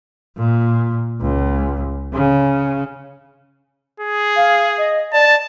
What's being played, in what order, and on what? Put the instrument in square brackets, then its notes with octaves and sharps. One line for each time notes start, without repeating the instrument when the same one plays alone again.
[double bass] A#2
C#2
C#3
[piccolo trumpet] G#4
[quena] F5
D#5
[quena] D5 [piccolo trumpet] A5